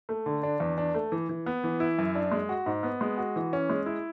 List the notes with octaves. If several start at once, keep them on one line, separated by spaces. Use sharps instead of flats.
A3
D3
D4
E2
D4
A3
E3
E3
B3
E3
E4
F#2
D4
G#3
F#4
G#2
B3
G#3
F#4
E3
C#4
G#3
E4